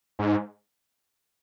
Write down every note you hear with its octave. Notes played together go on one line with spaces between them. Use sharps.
G#2